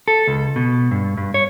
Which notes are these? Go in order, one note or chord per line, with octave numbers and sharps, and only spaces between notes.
A4
C#2
B2
G2
G2
C#5